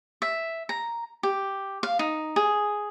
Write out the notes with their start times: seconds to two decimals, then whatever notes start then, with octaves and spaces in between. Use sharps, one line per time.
0.22 E5
0.69 A#5
1.23 G4
1.83 F5
1.99 D#4
2.36 G#4